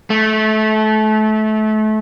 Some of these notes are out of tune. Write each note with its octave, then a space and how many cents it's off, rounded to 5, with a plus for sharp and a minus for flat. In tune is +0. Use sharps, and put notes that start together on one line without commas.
A3 -25